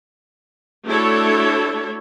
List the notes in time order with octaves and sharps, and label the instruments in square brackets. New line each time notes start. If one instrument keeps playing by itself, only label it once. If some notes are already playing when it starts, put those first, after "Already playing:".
[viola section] A3 D4 E4 F#4 A4 C#5